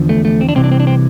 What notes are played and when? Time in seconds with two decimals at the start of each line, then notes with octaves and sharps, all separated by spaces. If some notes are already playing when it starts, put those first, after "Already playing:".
Already playing: E2 D3 F3
0.09 A3
0.25 A3
0.41 C4
0.49 D4
0.56 C2 C3 E3 C4
0.64 D4
0.72 C4
0.80 D4
0.87 C4